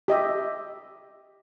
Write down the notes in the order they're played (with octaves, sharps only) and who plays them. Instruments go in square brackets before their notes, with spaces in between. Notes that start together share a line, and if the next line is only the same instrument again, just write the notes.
[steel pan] G4 D#5 E5